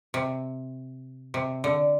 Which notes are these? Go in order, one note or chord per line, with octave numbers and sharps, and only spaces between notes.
C3
C3
D3